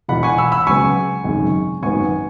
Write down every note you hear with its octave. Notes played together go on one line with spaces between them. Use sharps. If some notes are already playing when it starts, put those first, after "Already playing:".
E1 E2 B2 F#5 B5
G#5 C#6
B5 E6
B5 E6
C#2 C#3 F#3 B3 G#5 C#6
G#1 F#2 C#3
G#1 F#2 F#3 B3 G#5 C#6